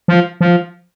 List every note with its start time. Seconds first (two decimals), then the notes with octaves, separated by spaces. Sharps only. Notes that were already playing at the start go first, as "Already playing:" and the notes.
0.08 F3
0.41 F3